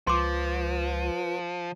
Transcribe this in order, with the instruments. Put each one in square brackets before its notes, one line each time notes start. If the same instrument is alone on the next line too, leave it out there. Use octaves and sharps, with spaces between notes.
[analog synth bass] C#2 [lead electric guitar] F3 [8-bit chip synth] F4 B4 [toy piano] C6 D6